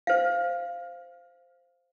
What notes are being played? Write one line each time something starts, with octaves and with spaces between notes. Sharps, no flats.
C5 F5